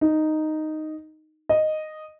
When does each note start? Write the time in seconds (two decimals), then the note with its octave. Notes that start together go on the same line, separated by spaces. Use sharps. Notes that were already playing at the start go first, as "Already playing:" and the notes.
0.01 D#4
1.49 D#5